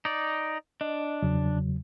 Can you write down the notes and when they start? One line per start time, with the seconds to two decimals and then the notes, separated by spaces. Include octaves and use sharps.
0.05 D#4 D5
0.81 D4 D#5
1.23 E2 C#3 F#3